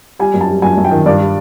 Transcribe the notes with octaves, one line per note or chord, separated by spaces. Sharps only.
G3 G#5
F#2
A5
G3
F#2 G#5
F#2
G5
D#3
G2 D5
G3